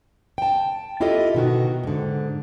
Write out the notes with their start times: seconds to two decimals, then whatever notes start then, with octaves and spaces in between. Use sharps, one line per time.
0.38 G5 A5
1.00 E4 F4 G4 A4 D#5
1.34 B2 D#3 F#4
1.84 G#2 D3